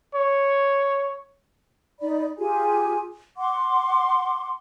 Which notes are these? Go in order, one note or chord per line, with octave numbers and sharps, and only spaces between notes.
C#5
D#4 D5 B5
F4 G4 G#4 G#5
F#5 C6 D6